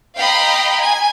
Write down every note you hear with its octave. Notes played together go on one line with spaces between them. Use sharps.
D#5 F5 G5 A#5 B5
G#5